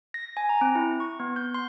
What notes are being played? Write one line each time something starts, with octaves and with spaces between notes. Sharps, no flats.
A#6
G#5
A#5
C4
E4
C#6
B3
G6
C6